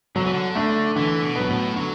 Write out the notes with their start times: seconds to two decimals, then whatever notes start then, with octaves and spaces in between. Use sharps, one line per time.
0.16 D3 F#3
0.24 E3
0.33 D3
0.55 A3 D4
0.96 D3 E3
1.23 B2
1.36 F#3 B3
1.49 A2
1.76 D3 F#3